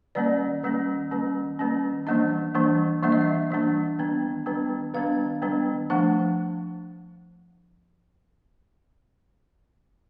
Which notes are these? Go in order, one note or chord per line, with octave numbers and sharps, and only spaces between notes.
D#3 G3 A#3 C#4 D5
D#3 G3 A#3 C#4
D#3 G3 A#3 C#4
D#3 G3 A#3 C#4
E3 G3 A#3 D4 D#5
E3 G3 A#3 D4
E3 G3 A#3 D4 E5
D#5
E5
E3 G3 A#3 D4
D#3 G3 B3 D4
D#3 G3 B3 D4
D#3 G3 B3 D4 F5
D#3 G3 B3 D4
F3 A3 D4 F#5